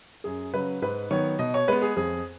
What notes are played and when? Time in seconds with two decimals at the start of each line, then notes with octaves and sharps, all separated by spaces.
0.24 F#2 G#4
0.54 C#3 F#3 B4
0.82 G#2 B4
1.11 D#3 F#3 B3 C#5
1.39 B2 D#5
1.54 C#5
1.68 G#3 B3 B4
1.82 G#4
1.97 F2 G#4